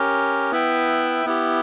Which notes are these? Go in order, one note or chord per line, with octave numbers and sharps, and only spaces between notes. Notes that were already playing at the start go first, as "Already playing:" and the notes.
Already playing: C#4 G4 A#4
B3 E4 B4 E5 G5
B3 E4 G4